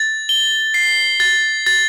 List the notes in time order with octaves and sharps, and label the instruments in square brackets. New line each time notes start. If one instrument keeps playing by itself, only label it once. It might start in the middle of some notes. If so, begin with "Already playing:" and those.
Already playing: [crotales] A6
G7
C7
A6
A6